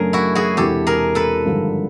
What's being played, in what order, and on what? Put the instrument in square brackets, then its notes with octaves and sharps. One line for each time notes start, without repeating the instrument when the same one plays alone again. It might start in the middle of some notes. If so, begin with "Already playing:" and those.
Already playing: [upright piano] F#2 C#3 F#3 A3 D4 [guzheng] G#4 A#4
[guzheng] E4 F#4
F#4 G#4
[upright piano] E1 E2 C3 E3 [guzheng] G4 A4
[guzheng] G#4 A#4
A4 B4
[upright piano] G#1 G2 D3 F3